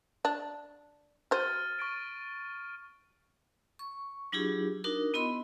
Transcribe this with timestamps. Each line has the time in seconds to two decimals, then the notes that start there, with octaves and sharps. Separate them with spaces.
0.25 D4
1.31 F#4 C5 F6 A6 D#7
1.79 C#6 A6 D7
3.79 C#6
4.32 F#3 D4 E4 F4 G4 G#4
4.84 D4 D#4 F#4 A#4
5.14 B3 E4 D#5 B5 C6